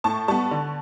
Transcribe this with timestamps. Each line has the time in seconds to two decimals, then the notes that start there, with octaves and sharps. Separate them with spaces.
0.04 A2 A5 C#6
0.28 G3 B3 A5 C#6
0.51 D3